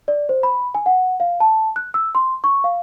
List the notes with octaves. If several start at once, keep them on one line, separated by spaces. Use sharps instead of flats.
D5
C5
B5
G#5
F#5
F5
A5
F#6
E6
C6
C#6
F5